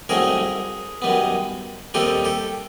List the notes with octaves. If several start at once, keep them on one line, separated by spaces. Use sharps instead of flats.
C2 C3 D#3 F#3 A3 G#4 A#4
F#2 D#3 G3 B3
D#2 D#3 G3 C4 F4 G4 A4
G4 A4